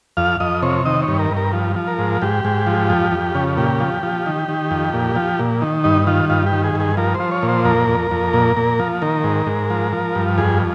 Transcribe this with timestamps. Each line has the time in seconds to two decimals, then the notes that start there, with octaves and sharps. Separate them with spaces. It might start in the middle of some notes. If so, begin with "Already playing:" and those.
0.17 F2 F5
0.40 F2 D#5
0.62 C3 C#5
0.85 D#3 D#5
1.02 C#5
1.08 G2
1.19 A#4
1.31 G2
1.37 A#4
1.53 F3
1.76 F3
1.87 A#4
1.99 G#2
2.22 G#2 G4
2.45 G#2
2.67 F3
2.90 F2
3.12 F2
3.35 C#3
3.57 A#2 G4
3.80 F3
4.03 F3
4.26 D#3
4.49 D#3
4.71 F2
4.93 A#2
5.16 F3
5.39 A#2
5.62 D#3
5.84 G2 D#4
6.07 D#3 F4
6.30 G2 F4
6.46 G4
6.52 D#3
6.64 G#4
6.75 G2 G#4
6.97 F3 A#4
7.15 C5
7.20 F3
7.31 C#5
7.42 A#2
7.49 C5
7.65 F2 A#4
7.89 F2
8.11 F2
8.34 A#2
8.57 A#2
8.79 F3
9.02 D#3 A#4
9.24 G#2
9.46 G#2
9.70 F3
9.93 F3
10.15 G2
10.38 F2 G#4